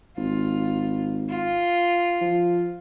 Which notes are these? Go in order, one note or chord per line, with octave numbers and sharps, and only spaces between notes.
G#1 F4
F4
F3